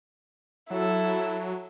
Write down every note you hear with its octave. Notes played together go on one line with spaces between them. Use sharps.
F#3 E4 A4